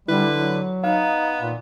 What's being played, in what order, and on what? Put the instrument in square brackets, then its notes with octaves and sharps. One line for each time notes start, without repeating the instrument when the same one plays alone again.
[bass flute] D3 [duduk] G3 [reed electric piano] E4 [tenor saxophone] B4
[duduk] F#3
[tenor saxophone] B3 [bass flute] D#4 [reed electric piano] F5
[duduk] A#2